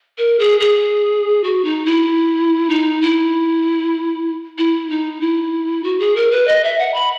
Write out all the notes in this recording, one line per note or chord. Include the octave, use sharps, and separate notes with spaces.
A#4
G#4
G#4
F#4
D#4
E4
D#4
E4
E4
D#4
E4
F#4
G#4
A#4
B4
D#5
E5
F#5
B5